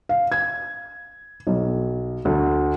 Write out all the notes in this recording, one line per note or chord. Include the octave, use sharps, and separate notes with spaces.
F5
G#6
B1
D2